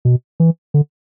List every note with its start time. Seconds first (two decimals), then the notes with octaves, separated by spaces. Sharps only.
0.05 B2
0.40 E3
0.74 D3